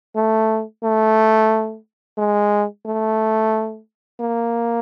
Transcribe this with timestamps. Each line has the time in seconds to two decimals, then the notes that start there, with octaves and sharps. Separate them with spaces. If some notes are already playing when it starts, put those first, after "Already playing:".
0.16 A3
0.83 A3
2.18 G#3
2.85 A3
4.20 A#3